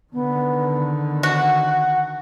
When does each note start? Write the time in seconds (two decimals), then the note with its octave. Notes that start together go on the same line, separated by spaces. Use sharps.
0.13 D3 D#3 B3
1.23 F#4 F#5